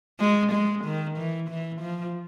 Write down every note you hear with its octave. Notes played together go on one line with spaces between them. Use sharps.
G#3
G#3
D#3
E3
E3
F3